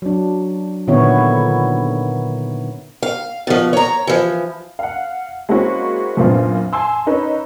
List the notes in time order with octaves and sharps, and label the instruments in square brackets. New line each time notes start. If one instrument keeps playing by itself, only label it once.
[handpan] F#3 D4
A#2 D3 D#3 B3 E4 C#5
[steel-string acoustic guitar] F5
B2 F3
C#5 A#5
E3 F3
[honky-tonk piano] F5 F#5
G#3 A#3 C4 C#4 E4 F#4
F#2 A#2 B3 C4 D4 F4
G#5 A5 C6 E6
C#4 D#4 B4 C#5